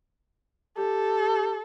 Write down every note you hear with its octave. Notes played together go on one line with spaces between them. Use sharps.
G4 A4